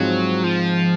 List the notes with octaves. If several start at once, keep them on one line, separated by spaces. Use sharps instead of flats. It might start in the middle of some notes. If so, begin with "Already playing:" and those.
Already playing: G#2 F3 F#3 G#3 C4
F3